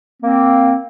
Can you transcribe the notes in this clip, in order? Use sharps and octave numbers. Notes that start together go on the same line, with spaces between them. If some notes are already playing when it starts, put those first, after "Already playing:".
A#3 C4